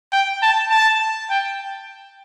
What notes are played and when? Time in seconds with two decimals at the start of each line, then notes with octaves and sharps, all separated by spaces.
0.13 G5
0.43 A5
0.71 A5
1.30 G5